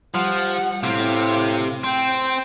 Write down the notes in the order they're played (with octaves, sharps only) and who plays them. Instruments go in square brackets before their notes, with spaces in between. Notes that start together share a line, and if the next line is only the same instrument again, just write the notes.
[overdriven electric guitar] F3 [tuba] G3 [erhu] F#5
[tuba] A2 [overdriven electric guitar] C3 C4 [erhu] F5
[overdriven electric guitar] C4 [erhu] G5